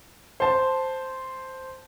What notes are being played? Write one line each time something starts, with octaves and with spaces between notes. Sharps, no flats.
C5 A5